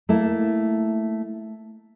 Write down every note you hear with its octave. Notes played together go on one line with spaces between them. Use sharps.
A3 A#3 E4